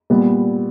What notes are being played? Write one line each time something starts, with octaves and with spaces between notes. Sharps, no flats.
A#2 G3 B3